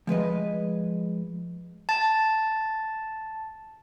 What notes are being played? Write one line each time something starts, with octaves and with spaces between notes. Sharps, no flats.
F3 G#3 B4 D#5
A5 A6